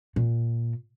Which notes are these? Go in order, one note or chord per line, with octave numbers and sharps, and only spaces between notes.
A#2